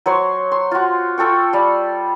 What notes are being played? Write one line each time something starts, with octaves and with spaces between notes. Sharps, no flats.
F#3 C5 C#5 C6
C6
F4 F#4
F4 A4 G5 C#6
G3 F5